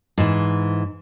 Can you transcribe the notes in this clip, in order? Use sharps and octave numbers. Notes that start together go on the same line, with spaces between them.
G#2 E3